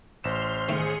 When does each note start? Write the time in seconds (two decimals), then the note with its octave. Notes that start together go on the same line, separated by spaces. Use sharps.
0.24 A1 C5 C6 F6 E7
0.69 D#3 A3 G#4 C#7